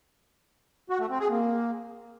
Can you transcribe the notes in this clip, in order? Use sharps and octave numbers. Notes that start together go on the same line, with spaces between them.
F#4
A3
C4
G#4
A#3